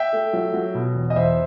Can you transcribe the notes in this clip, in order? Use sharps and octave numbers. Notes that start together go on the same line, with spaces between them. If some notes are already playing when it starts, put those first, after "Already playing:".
Already playing: E5 G5
A3
F#3
F#3
B2
E2
D#5
E2 C5 E5